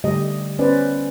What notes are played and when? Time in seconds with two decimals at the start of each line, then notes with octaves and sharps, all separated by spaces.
0.04 D3 G3 A3 G4 D#5
0.59 B3 C#4 B4 C5 D5